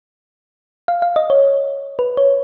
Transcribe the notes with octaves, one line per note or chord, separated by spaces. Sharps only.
F5
F5
D#5
C#5
B4
C#5